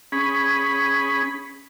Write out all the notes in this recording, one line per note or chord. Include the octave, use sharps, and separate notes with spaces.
C#4 G#4 B5